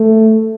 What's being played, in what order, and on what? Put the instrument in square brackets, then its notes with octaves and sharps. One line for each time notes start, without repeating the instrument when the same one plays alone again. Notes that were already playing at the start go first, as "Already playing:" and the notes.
Already playing: [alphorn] A3